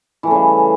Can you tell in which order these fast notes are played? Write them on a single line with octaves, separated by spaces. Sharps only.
E3 A3 C#3 G3